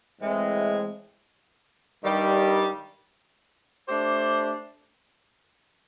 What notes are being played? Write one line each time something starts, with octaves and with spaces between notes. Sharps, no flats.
A2 E3 G#3 C4
G2 D#3 G3
A3 D4 G4 C5